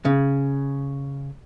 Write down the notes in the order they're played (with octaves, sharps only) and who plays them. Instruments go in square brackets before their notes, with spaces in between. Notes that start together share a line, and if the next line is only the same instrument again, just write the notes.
[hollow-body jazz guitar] C#3